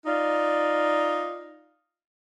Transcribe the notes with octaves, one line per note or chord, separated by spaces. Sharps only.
D#4 F4 D5